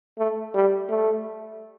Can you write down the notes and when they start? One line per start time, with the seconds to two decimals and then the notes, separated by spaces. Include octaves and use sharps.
0.18 A3
0.54 G3
0.89 A3